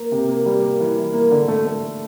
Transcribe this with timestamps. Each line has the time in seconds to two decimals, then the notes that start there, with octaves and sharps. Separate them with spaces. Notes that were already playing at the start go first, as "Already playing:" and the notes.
Already playing: A#3
0.12 C3
0.29 A#3
0.46 G3
0.63 A#3
0.80 E3
0.96 E3
1.13 A#3
1.31 D3
1.48 A3
1.66 A3